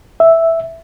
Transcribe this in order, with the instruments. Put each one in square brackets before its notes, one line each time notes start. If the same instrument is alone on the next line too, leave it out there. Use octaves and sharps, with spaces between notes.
[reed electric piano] E5